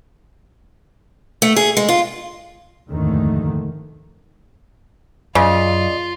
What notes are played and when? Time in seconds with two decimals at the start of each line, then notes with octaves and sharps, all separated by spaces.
1.42 A3
1.56 G#4
1.77 G#3
1.89 F4
2.90 F1 D#2 G#2 D3 D#3 A3
5.35 F#2 C#3 F4 D5 D#5